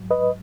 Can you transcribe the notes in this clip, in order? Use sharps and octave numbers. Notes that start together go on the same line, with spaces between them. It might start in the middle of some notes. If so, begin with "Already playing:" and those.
Already playing: G#2 F#3
B4 D#5